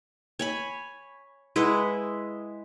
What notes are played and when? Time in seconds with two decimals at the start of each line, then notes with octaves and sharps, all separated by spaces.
0.39 C#5 G#5 B5
1.56 G#3 E4 B4 F#5